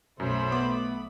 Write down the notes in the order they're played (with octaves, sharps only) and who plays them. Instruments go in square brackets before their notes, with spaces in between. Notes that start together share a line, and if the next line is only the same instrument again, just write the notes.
[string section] B1 A3 B5 [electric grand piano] F#2 [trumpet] C5
[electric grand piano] B3 D6